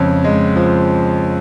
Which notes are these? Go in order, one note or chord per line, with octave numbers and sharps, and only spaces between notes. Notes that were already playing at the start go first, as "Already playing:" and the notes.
Already playing: F2 C#3 F3 G#3 C#5
G#3
F3